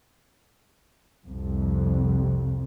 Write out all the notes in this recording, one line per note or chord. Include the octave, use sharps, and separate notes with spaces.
C2 F2